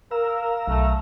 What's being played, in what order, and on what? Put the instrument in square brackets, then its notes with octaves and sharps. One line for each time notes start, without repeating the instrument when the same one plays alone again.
[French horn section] A#4 [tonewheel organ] F5 A#5 E6
[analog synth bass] B1 [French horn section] A3